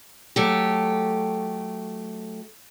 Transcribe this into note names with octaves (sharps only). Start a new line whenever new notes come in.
F#3 A3 G4